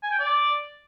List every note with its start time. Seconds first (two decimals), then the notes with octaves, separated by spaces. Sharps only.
0.03 G#5
0.11 G5
0.19 D5